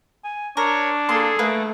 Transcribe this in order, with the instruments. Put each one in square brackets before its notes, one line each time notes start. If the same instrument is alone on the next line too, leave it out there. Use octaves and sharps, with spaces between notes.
[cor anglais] G#5
[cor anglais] D4 [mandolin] A#4 [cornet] C#5
[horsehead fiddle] A#3 A4 [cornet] G#4 [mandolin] C6
[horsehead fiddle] A3 [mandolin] A#3 B4